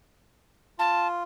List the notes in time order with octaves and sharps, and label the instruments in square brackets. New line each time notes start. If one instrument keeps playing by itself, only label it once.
[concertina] F4 [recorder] A5